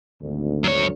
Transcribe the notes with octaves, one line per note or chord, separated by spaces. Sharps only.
G#1 D2
F#2 C#5